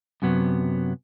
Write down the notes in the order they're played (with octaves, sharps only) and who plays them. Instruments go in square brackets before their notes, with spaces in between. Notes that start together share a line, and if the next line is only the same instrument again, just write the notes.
[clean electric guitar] F#2 C3 F#3 B3